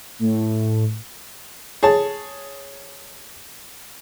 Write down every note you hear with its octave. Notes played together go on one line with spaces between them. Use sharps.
A2
G#4 C#5 A5